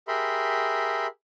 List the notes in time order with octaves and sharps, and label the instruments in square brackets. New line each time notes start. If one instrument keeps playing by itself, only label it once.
[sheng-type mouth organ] G4 G#4 A#4 E5 B5 C6